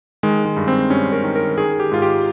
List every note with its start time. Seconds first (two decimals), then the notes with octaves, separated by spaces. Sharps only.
0.23 D#3 G#3
0.45 G#3
0.57 G2
0.68 C4
0.90 G2 C#4
1.13 A#4
1.24 D#3
1.36 A#4
1.57 D#3 G#4
1.80 G4
1.91 G#2 F4
2.02 G4